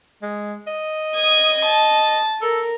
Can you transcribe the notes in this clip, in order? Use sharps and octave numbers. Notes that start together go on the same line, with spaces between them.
G#3
D#5
D#6 G#6
A5
A4 A#4